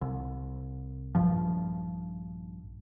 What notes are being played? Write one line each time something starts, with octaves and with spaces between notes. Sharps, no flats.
C2
A#1 G2 F3